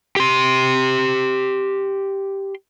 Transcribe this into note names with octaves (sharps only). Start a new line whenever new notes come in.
G4 C6